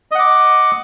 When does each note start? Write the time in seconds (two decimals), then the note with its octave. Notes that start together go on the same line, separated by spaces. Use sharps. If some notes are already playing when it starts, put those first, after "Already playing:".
0.11 D#5
0.15 F#5
0.19 D6